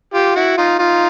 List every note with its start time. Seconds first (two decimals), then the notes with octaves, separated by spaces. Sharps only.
0.14 F4 G4
0.35 E4 F#4
0.57 D#4 F4
0.79 D#4 F4